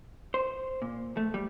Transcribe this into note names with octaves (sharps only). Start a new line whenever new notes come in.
C5
A#2
A3
G3